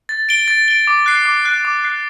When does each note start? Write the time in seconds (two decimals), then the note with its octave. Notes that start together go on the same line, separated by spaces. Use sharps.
0.09 A6
0.29 D7 G7
0.48 A6
0.68 D7 G7
0.87 D6
1.06 F#6 C7
1.25 D6
1.45 F#6 C7
1.65 D6
1.85 F#6 C7